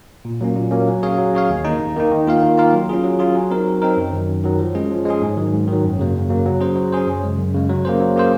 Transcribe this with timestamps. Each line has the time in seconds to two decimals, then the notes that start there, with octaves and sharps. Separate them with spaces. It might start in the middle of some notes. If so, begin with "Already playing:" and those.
0.25 A#2
0.41 F#3 A#3 C#4
0.56 A#2
0.71 F#3 A#3 C#4
0.88 F#3
1.03 C#4 G#4 C#5 F5
1.18 F#3
1.34 C#4 G#4 C#5 F5
1.49 D#2
1.65 D#3 A#3 D#4
1.80 D#2
1.96 D#3 A#3 D#4
2.11 D#3
2.27 A#3 F4 A#4 F5
2.43 D#3
2.57 A#3 F4 A#4 F5
2.73 F#3
2.89 C#4 F4 G#4
3.04 F#3
3.19 C#4 F4 G#4
3.35 F#3
3.51 C4 D#4 A#4
3.67 F#3
3.82 C4 D#4 A#4
3.97 F#2
4.12 D#3 F#3
4.28 F#2
4.44 D#3 F#3
4.59 F3
4.75 G#3 C#4 G#4
4.91 F3
5.06 G#3 C#4 G#4
5.22 G#2
5.37 D#3 F#3
5.53 G#2
5.68 D#3 F#3
5.83 F#2
5.99 C#3 F#3 A#3
6.15 F#2
6.30 C#3 F#3 A#3
6.45 F#3
6.61 C#4 G#4 C5
6.76 F#3
6.92 C#4 G#4 C5
7.08 F#2
7.23 C#3 G#3
7.39 F#2
7.54 C#3 G#3
7.69 F#3
7.85 A#3 C#4 G#4 C5
8.01 F#3
8.16 A#3 C#4 G#4 C5